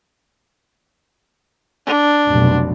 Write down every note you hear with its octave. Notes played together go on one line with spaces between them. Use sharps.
D4
F1 B1 B2